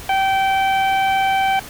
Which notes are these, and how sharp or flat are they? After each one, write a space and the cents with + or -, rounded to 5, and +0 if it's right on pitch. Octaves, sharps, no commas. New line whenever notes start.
G5 -20